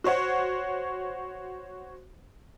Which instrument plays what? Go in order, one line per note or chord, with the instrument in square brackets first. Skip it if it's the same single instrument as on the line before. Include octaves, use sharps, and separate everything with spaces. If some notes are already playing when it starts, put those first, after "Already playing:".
[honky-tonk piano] F#4 C5 C#5 F#5